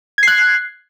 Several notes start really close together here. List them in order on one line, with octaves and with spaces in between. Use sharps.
G#6 C7 F#6